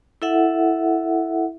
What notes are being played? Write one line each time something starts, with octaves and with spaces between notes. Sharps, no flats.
E4 A4 E5 F#5